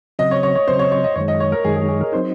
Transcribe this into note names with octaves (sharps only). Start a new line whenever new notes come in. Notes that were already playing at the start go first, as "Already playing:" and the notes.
C#3 F#3 C4 D#5
C#5
C#5
C#5
C#3 F#3 C4 C5
C#5
C#5
D#5
F#2 D#3 G#3 C#5
D#5
C#5
A#4
F#2 D#3 G#3 G#4
G#4
G#4
A#4
F#3 C4 D#4 C5